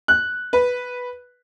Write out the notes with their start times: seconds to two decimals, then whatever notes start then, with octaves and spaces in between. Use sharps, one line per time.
0.08 F#6
0.53 B4